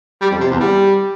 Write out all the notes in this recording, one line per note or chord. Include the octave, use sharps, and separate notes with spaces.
G3
F2
C3
E2
G3